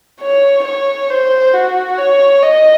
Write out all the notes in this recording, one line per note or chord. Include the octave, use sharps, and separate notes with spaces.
C#5
C#5
C5
F#4
C#5
D#5